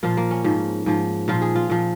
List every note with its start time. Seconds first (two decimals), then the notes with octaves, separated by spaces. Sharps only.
0.03 A#2 F3 F4
0.17 A#3
0.31 C#4
0.44 G#2 F3
0.86 G#2 F3
1.28 A#2 F3 F4
1.41 G#4
1.56 F4
1.70 A#2 F3